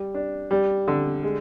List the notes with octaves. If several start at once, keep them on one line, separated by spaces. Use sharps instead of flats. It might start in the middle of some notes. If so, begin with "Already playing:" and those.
Already playing: G3
D4
G3
D3
G#3